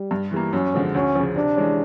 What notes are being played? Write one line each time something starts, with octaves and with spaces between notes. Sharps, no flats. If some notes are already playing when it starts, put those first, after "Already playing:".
Already playing: G3
G2
E3 G3 A#3
F#2 C#4
D3 F3 G#3 C4
D2 C#4
C#3 F3
C3 D4
E3 G#3 C#4